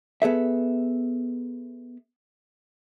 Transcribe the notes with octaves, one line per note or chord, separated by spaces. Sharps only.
B3 G#4 A4 E5